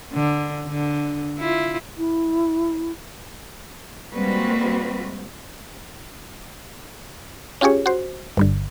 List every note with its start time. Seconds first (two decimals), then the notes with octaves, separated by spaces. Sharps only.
0.13 D3
0.67 D3
1.38 E4 F4
1.98 E4
4.13 G3 G#3 A#3 C4 F#4 B4
7.61 C#4 F4 G4 G#4 C#5
7.86 F#4 C5
8.37 G1 G2 D3